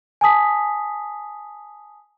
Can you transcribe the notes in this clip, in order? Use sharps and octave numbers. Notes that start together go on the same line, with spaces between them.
G#5 A5 D#6 B6